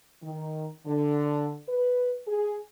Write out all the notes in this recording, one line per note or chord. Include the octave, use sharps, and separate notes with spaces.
D#3
D3
B4
G#4